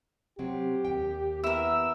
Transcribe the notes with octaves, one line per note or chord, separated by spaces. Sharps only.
C3 F#3 C4 G4
D#2 G5
B3 E4 A#4 E6